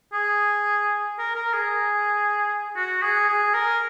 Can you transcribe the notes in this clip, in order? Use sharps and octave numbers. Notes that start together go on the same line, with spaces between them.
G#4
A#4
A#4
G#4
F#4
G#4
G#4
A#4